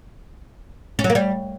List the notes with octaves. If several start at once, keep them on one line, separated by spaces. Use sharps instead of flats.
C#4
F#3
A#3
G3